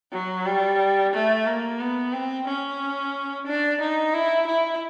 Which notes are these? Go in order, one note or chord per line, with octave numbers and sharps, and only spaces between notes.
F#3
G3
A3
A#3
B3
C4
C#4
D4
D#4
E4
E4